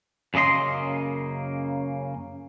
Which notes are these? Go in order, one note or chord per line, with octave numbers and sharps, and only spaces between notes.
F#2 C#3 A#3 D#5 C6